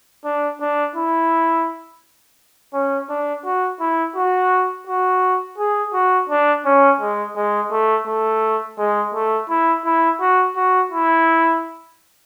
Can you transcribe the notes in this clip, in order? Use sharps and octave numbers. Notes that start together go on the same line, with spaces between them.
D4
D4
E4
C#4
D4
F#4
E4
F#4
F#4
G#4
F#4
D4
C#4
G#3
G#3
A3
A3
G#3
A3
E4
E4
F#4
F#4
E4